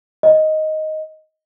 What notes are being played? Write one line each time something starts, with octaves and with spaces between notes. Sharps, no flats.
D#5